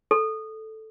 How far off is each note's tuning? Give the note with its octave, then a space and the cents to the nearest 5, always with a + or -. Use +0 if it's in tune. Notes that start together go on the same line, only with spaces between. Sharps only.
A4 -5